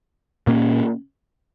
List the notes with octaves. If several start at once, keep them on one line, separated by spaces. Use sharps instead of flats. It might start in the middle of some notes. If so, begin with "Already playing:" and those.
A#2 A#3 C#4